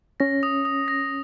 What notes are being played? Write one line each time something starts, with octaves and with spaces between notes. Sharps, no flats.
C#4 A#6
D#6
D#6
A#6